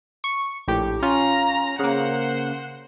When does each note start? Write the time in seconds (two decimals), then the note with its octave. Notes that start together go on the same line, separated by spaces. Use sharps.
0.24 C#6
0.67 A#1 A2 G4
1.02 C#4 F4 A#5
1.79 C#3 A#3 C5 F#5